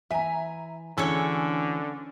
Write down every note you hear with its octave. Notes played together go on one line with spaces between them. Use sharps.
E3 E5 G#5 A#5
D2 D3 E3 C#4 A4 C#5 E6 C#7